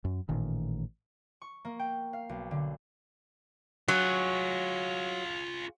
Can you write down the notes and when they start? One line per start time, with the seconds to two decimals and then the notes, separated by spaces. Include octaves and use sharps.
0.05 F#2
0.29 A1 A#2 D#3
1.42 C#6
1.65 A#3
1.79 G5
2.13 F5
2.29 B1
2.51 D3
3.88 F#3 F4 G#4